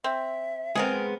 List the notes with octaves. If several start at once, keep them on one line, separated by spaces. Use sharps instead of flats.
C4 E5
G#3 B3 C4 G#4 A#4